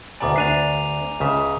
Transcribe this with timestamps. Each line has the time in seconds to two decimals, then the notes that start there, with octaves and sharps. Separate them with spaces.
0.20 D2 B2 D5 G#5 A#5 D6
0.36 D2 D4 B4 C7 D#7 F7
1.20 C#2 C#3 E5